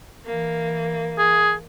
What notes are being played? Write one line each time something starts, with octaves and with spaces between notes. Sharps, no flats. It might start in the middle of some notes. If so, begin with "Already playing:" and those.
E3 A#3
G#4